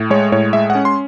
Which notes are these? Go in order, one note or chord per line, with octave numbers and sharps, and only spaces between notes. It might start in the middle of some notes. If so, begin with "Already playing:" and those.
Already playing: A2
G#3 C#5
A2 C#5
G#3 E5
F#5
C#4
C6